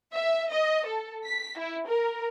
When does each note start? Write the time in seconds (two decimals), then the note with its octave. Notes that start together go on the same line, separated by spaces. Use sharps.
0.13 E5
0.50 D#5
0.86 A4
1.26 B6
1.59 E4
1.88 A#4